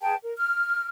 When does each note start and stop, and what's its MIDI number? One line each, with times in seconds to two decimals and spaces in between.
0.01 0.14 68
0.01 0.14 71
0.01 0.14 79
0.01 0.14 81
0.21 0.33 70
0.36 0.88 89